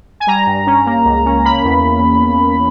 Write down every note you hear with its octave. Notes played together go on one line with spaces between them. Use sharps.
G#5
G3 A#5
G2
C#4
A#3
C#2
C#4
A#3 B5
E2